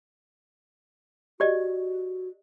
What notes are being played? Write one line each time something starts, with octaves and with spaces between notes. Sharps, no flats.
F#4 G4 D5 D#5